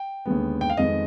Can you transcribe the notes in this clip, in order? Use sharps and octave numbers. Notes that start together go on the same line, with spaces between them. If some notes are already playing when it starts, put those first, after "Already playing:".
Already playing: G5
D#2 D3 G#3 B3
G5
F5
F2 D#3 G#3 B3 D#5